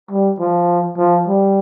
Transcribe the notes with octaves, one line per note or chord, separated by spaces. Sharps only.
G3
F3
F3
G3